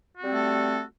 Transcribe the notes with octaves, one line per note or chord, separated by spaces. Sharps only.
G3 A3 C4 F#4 A4